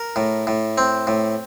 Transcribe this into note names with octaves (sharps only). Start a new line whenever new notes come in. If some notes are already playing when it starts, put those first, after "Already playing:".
Already playing: A#4
A2
A2
C4
A2